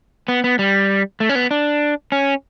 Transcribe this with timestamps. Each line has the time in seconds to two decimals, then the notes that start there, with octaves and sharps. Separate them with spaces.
0.28 B3
0.44 B3
0.59 G3
1.20 A3
1.29 C#4
1.35 B3
1.51 D4
2.12 C#4